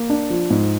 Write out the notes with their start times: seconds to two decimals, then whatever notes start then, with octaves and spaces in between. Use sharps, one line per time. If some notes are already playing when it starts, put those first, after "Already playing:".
Already playing: A#3
0.10 D4
0.30 F3
0.50 G#2